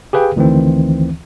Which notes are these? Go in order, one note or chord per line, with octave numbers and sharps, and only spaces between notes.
G4 G#4 B4 F5 G5
D2 D#3 E3 C4